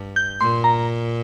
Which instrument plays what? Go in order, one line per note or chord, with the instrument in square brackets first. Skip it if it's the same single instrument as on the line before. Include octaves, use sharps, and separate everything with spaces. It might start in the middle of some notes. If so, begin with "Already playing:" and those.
Already playing: [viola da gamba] G2
[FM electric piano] G6
[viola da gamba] A#2 [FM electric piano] C6
[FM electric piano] A#5